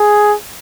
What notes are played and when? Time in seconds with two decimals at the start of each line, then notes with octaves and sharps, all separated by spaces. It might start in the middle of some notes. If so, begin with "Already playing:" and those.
Already playing: G#4